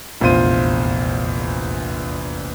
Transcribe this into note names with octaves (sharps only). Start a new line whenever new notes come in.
F1 A#1 E2 F4 C5 D#7